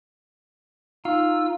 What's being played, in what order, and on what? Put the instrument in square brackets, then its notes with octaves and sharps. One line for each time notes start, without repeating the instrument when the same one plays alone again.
[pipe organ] D#4 E6 [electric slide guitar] F4